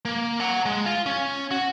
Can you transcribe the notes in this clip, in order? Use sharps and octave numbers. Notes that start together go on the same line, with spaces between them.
A#3
F#5 A#5
G#3
F4
C#4
F#4